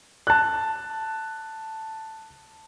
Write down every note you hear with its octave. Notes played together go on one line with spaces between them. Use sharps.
A5 F#6